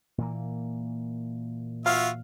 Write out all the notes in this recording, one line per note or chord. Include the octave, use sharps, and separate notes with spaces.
A#2 E3 A#3
F4 F#4 E5 F5